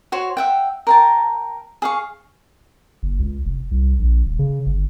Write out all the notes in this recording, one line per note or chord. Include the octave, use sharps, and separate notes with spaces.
F#4 C5 C#5 C#6
E5 F#5 G5
A#4 G5 A5
G#4 F5 C#6
F#1
C#2
F1
C2
A#1
D#1
C#3
G1